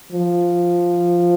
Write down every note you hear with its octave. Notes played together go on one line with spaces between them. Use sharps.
F3